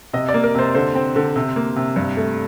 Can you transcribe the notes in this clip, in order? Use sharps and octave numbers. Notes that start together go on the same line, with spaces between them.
C3 D#5
D5
A#3
A#4
C3 C5
D3 C5
C4
D3
C3
A#3
C3
G2
A3